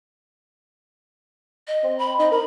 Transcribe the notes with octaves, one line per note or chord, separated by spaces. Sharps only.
D#5
C4
B5
D#4 D#5
A#4 B5